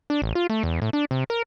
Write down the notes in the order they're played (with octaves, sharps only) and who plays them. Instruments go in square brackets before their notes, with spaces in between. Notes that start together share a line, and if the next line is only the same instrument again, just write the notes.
[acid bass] D4
A1
F4
A3
E2
A2
D4
C3
A#4